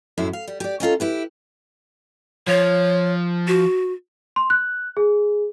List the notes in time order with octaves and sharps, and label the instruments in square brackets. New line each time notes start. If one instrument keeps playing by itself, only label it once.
[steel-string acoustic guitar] F#2 A2 E4
F5
G3
G4 D5
C#4 D#4 F4 A4
E4 G4 B4
[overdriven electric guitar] F3 [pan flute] C#5
[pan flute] F#4
[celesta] C6
F#6
G#4